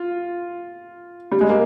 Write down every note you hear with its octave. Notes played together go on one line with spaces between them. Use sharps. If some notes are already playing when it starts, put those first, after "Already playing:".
Already playing: F4
G3
G#3
A#3